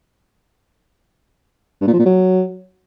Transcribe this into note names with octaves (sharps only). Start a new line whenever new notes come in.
G2
A#2
F3
A#2
F#3